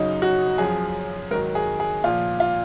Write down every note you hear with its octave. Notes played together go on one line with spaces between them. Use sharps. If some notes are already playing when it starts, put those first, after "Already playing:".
Already playing: F#2 C#3 F#3 D#4
F#4
F#2 F3 G#4
G#2 D#3 F#3 A#4
G#4
G#4
A#2 F3 F4
F4